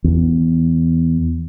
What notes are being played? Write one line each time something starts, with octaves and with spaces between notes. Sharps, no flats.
E2